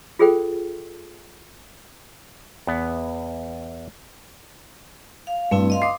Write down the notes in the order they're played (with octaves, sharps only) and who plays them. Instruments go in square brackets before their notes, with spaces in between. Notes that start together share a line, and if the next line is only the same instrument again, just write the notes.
[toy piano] F4 G#4 A4 C5 G5
[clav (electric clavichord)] E2 B3
[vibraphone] F5
[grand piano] G2 [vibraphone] A3 C4 E4
[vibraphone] D#5 F5 C6
[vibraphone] D6 D#6 [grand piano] C7